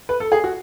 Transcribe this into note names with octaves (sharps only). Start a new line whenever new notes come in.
B4
A4
G#4
F#4